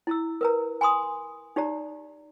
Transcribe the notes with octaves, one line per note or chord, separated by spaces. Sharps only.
E4 A#5 E6
A#4 B4 A#5
G#5 B5 C6 D#6
D#4 G4 D5 A#5